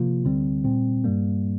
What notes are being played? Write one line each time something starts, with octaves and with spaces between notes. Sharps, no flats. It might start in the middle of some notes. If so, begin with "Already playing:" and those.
Already playing: C3 F3 A#3 F4
D2 D3 G3 C4
A#2 G3 C4
G2 G3 A#3